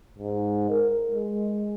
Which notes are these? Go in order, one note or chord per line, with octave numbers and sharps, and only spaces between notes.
G#2
A#4
G#3